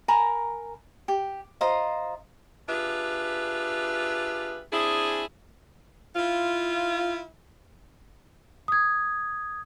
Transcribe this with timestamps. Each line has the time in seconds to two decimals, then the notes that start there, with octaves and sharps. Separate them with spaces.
0.08 A#4 G#5 A#5 B5
1.08 G4
1.61 F4 C5 D#5 A#5
2.68 D4 F4 G4 G#4 B4 E5
4.73 C4 D4 E4 G#4
6.16 E4 F4
8.68 D#6 G#6